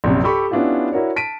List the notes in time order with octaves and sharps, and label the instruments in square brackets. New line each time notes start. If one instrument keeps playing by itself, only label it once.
[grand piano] A#1 F#2 C3
G4 A4 B5 C#6
B3 C#4 D4 E4 F4 G4
E4 F#4 A#4 C#5 D5
A5 B6 D7 D#7